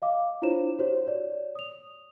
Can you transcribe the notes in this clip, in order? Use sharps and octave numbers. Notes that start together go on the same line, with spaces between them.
D#5 F5 D6
D4 E4 F4 C5 C#5 E7
F#4 G4 C5 C#5
C#5 D5
D#6 F7